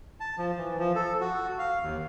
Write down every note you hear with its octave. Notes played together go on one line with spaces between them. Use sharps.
A5
F3
E3
F3
A4
F#4
F5
D#2